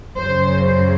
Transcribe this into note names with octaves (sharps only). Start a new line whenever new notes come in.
F#2 C#3 F#3 C5
C5